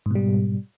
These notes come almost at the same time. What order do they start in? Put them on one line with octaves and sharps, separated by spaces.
G#2 B2 G3